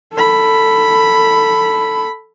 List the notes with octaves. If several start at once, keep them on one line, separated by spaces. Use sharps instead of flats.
A4 B5